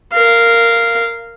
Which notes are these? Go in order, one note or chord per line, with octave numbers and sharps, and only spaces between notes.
A#4 F5